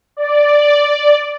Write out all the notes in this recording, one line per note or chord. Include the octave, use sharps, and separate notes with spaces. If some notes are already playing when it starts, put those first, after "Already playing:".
D5